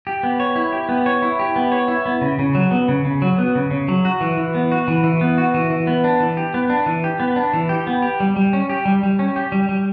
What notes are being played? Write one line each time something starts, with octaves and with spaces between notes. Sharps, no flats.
G4
B3
C#5
E4
G4
B3
C#5
E4
G4
B3
C#5
E4
B3
C#3
C#3
F#3
B3
C#3
C#3
F#3
B3
C#3
C#3
F#3
F#4
E3
E3
B3
F#4
E3
E3
B3
F#4
E3
E3
B3
D4
E3
G4
B3
D4
E3
G4
B3
D4
E3
G4
B3
G4
G3
G3
C#4
G4
G3
G3
C#4
G4
G3
G3